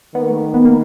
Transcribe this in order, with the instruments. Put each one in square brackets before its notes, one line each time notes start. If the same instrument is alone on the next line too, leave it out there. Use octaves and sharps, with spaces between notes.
[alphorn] D#3 [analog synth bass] B3
[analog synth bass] A#3
A3
A#3
B3
A#3